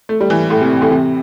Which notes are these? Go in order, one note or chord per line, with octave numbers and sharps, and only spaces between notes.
A3
G3
E3
A2
C3
A2
C3